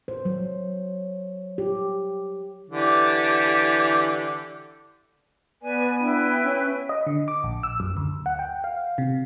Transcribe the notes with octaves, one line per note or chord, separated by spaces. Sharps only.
C5
F#3
G4
D3 E3 G4
B3 B4 D5 G#5
D4 E4 B4 G5
C#4
D#5
D3
D6
A#1
E6
F#2
D2
F#5
G5
F5
C3